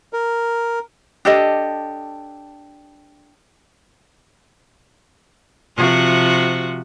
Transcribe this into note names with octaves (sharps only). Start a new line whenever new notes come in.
A#4
D4 G4 A4 D#5
C3 F3 F#4